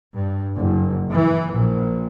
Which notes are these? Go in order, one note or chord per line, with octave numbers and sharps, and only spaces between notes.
G2
F#1
E3
A#1